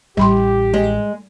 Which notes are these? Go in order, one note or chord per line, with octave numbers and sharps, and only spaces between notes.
A1 G3 G4 B5 C6
G#3